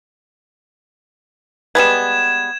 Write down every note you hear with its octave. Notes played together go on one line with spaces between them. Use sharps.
G3 G#3 B3 G#6 E7